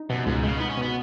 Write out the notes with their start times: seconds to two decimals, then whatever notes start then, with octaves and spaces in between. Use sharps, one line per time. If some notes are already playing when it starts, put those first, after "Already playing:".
Already playing: D#4
0.10 F#2 B2
0.26 C#2 G#2
0.43 C#3 G#3
0.57 B3 D#4
0.69 C#4
0.77 B2 B3